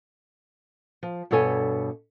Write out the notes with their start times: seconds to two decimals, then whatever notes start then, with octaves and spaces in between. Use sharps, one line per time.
1.03 F3
1.31 G2 B2 D4 A4 C#5 G#5